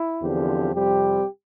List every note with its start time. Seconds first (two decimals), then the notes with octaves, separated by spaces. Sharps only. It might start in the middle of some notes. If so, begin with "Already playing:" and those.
Already playing: E4
0.22 E2 D3 F3 C4 G4
0.73 F2 C3 G3 C4 G4